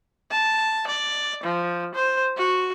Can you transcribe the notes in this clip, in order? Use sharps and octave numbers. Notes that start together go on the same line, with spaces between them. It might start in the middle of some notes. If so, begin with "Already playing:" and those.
A5
D5
F3
C5
F#4